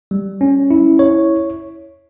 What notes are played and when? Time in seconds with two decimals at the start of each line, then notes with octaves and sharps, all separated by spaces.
0.11 G3
0.41 C#4
0.71 E4
0.99 C#5